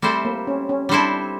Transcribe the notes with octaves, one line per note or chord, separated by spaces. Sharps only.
G3 A3 C4 E4 A4 C5
A#3
C#4
C#4
G3 C4 D4 E4 A4 C5